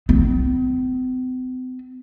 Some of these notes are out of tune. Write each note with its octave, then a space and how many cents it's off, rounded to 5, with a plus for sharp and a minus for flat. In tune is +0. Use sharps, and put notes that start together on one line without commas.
C4 -45